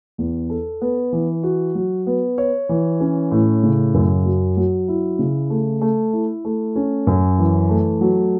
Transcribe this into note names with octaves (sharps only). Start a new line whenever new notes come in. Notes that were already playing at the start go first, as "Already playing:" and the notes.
E2
A4
B3
E3
F#4
F#3
B3
C#5
E3
C#4
A2
C#3
F#2
F#3
F#3
E4
C#3
A3
A3
E4
A3
C#4
F#2
E3
A3
F#3